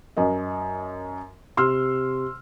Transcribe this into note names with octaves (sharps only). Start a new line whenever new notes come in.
F#2 A#4 D#5
C3 C6 E6 F6